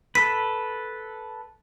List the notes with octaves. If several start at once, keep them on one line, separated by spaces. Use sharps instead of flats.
A4 B4 B6